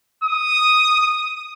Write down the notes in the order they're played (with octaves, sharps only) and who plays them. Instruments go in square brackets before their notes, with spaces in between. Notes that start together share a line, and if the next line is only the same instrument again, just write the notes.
[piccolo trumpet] D#6